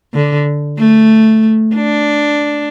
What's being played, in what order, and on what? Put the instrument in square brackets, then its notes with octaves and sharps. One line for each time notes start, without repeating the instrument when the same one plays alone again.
[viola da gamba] D3
A3
D4